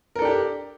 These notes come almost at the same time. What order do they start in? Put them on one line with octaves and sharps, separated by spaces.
A#4 A4 D4 G4